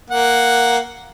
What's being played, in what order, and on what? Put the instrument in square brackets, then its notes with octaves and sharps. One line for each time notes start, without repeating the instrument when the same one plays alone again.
[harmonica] A#3 F#5